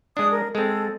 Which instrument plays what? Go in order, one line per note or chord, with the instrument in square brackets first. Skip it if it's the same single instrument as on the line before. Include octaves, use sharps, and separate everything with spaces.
[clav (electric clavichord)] G#3 D4 [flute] D#6
[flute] A#4
[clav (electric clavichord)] G#3 C4 [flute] A4